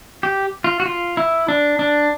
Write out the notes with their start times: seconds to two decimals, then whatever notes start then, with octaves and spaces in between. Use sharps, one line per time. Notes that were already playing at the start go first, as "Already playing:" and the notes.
0.23 G4
0.64 F4
0.80 F#4
0.86 F4
1.17 E4
1.48 D4
1.79 D4